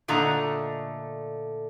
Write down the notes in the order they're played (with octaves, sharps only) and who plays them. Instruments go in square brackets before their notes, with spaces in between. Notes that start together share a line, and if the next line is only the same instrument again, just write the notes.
[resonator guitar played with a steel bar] A#2 D3 A3 D#5 A#5